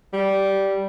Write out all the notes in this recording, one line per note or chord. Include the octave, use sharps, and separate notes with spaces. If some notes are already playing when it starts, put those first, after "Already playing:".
G3